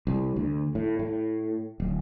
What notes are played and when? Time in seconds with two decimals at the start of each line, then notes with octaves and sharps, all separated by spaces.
0.07 C2
0.36 D2
0.75 A2
0.99 A2
1.80 D1